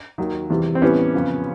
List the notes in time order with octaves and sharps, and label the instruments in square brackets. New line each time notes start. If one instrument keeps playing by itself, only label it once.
[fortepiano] D#2 D#3 F#3
E2 C3 E3 G3
C4
A2 E3 G3 B3 C#4
F2 C#3 F3